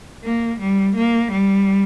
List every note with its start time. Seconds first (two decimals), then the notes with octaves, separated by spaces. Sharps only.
0.24 A#3
0.60 G3
0.95 A#3
1.31 G3